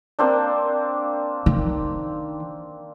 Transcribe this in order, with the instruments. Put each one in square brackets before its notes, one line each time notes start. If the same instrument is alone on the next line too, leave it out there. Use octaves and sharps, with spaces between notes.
[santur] A#3 C4 D4
[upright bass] D#3